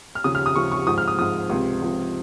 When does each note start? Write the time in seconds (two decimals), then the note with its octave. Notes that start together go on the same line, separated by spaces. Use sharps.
0.15 F6
0.24 D#2 C#3 F3 D#6
0.35 F6
0.46 D#6
0.55 D#2 C#3 F3 C#6
0.72 C#6
0.87 G#2 F3 D#6
0.98 F6
1.08 D#6
1.19 G#2 F3 D#6
1.49 C#2 C3 F3
1.82 C#2 C3 F3